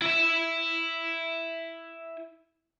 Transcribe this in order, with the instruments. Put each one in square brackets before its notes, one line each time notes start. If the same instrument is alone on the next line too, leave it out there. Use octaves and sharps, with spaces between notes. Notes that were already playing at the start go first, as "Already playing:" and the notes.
[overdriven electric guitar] E4 E5